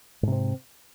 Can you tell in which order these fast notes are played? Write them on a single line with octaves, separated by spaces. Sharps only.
G#2 C3 C4